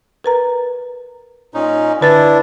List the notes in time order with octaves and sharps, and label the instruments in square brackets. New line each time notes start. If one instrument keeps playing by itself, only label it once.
[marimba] A#4 B4 A#5
[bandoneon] A#2 C#4 D#4
[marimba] D3 B4 A6 [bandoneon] D4 E4